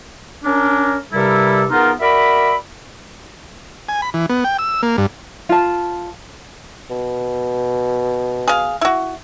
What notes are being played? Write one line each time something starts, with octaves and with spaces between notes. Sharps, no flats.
C#4 D4 A#4
G2 C3 G3 E4 A4 A#4
E2 B3 D#4 F4 A#4
F#4 A#4 D5 E5 B5
G#5
B5
E3
B3
G5
E6
A#3
G2
F4 A5
B2
G#4 F5
E4 F#4